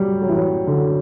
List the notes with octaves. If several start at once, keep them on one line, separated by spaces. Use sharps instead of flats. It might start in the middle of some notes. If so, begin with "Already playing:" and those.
Already playing: F#3 G3
F#3
E3
F#3
D3